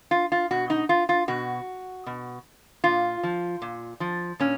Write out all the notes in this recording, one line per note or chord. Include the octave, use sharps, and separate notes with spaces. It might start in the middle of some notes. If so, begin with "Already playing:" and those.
F4
F4
B2 F#4
D#4
F4
F4
B2 F#4
B2
A#2 F4
F3
A#2
F3
A#2 C#4